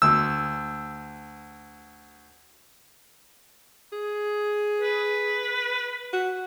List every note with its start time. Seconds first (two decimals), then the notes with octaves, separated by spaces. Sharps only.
0.02 D2 E6
3.92 G#4
4.81 B4
6.13 F#4